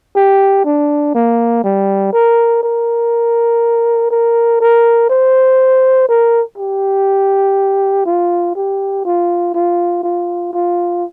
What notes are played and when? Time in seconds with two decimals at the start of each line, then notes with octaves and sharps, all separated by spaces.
0.16 G4
0.65 D4
1.15 A#3
1.64 G3
2.13 A#4
2.63 A#4
4.11 A#4
4.61 A#4
5.10 C5
6.09 A#4
6.58 G4
8.06 F4
8.56 G4
9.05 F4
9.54 F4
10.04 F4
10.53 F4